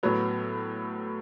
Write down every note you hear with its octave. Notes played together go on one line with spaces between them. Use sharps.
A2 F#3 B3